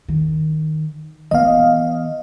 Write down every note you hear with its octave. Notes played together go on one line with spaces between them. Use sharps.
D#3
E3 B3 D#5 F5